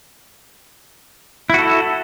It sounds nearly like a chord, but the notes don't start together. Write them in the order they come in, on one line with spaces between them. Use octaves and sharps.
E4 F#4 A4